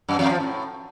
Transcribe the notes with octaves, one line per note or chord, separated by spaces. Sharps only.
F#2
F2
F3
A2